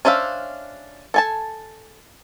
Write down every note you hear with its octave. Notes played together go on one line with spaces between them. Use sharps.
C#4 D4 C5 E5 F5
A4 G#5 A5